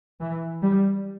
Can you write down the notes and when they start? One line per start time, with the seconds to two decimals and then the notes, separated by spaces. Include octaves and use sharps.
0.20 E3
0.61 G3